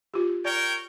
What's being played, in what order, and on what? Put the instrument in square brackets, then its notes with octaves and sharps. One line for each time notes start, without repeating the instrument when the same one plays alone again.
[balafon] F4 G4
[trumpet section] A#4 C#5 G5 [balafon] D5